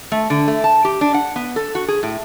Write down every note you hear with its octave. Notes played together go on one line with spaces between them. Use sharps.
A3
D3
A3
A5
G4
D4
F#5
B3
A4
F#4
G#4
A2